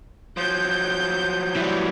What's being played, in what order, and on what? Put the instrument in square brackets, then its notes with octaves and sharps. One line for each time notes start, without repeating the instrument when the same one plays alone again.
[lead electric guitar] F3 F#3 [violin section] G6
[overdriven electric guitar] E3 G3